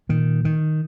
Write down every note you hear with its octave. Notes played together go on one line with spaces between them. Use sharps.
A#2 D#3
D#3